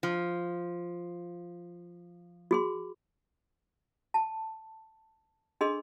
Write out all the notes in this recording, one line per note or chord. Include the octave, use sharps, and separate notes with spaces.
F3
F#4 G#4 C6
A5
D4 G#4 A4 D#5 C6 E6